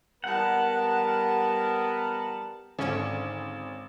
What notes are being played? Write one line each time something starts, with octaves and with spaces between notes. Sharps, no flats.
G3 B3 A#4 F#5 A5
G#1 D3 C#4